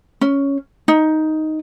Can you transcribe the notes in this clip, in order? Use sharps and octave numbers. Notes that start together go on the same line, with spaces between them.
C#4
D#4